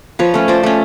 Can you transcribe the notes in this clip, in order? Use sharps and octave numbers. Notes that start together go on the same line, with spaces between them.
F3 B4 C#5
A3 C#4
F3 C5 D5
A3 C#4